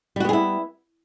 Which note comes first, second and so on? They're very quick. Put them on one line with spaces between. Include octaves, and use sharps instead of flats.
G3 F#4 B3 G#4 E4